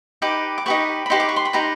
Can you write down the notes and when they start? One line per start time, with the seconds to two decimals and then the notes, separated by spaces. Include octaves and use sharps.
0.22 D#4 G4 B4 D6
0.58 D6
0.66 D#4 G4 B4 C#6
1.06 B5
1.10 D#4 G4 B4 C6
1.20 D6
1.29 C#6
1.36 C6
1.45 B5
1.53 D#4 G4 B4 A#5